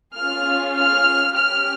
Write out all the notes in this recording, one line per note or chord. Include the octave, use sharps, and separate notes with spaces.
C#4 F4 G#4 F6
F6
C#4 G4 F6